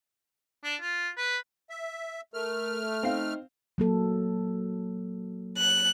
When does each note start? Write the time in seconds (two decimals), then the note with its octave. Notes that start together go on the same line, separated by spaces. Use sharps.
0.64 D4
0.81 F4
1.17 B4
1.70 E5
2.34 A3 A#4 F6
3.03 C4 D#4 F5
3.78 F#3 A#3 A4
5.58 F#6